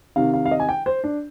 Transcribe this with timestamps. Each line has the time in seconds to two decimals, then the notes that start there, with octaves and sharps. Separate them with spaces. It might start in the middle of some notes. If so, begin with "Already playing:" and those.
0.16 C3 D#3 F5
0.34 F5
0.46 F5
0.51 D#5
0.60 G#5
0.69 G5
0.86 C5
1.04 D4